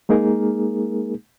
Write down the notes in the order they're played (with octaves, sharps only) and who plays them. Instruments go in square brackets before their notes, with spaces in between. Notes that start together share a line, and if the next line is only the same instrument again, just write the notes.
[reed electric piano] G#3 A#3 D#4 G#4 A#4